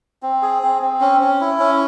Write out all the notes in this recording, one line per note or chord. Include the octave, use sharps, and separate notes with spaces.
C4
G#4
C4
C4
C#4
C#4
E4
C#4